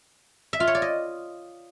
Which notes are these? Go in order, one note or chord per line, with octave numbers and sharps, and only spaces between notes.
E5
F4
C#5
D5
D#5